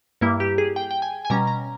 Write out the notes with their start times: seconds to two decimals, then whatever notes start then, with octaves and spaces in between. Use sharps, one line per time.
0.21 G2 G3 A#3 E4
0.40 G4
0.58 G#4
0.76 G5
0.91 G5
1.02 G#5
1.25 G#5
1.30 B2 G3 C#4 A#5
1.47 A#5